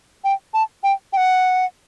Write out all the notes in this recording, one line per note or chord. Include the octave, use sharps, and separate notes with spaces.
G5
A5
G5
G5
F#5